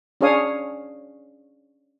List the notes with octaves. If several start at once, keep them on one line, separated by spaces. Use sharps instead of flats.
C#4 D4 G#4 C#5 F5 D#6